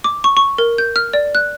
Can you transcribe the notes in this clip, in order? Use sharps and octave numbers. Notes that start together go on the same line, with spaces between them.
D6
C#6
C#6
A#4
G6
F6
D5
F#6